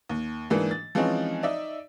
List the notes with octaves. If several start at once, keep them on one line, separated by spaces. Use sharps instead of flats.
D#2
G#2 E3 A#3 D4
A6
E3 F3 G#3 C4 C#4 D#4
D#4 D5 E5